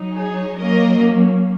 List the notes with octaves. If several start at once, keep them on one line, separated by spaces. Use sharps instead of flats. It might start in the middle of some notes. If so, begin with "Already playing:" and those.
Already playing: F#3 D#4
G#4 C#5
F#3 A#3 C#4 A#4 D#5